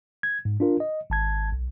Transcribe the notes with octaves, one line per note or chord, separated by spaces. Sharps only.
G#6
G#2
D4 F4 A#4
D#5
G#1 A5 G#6
B1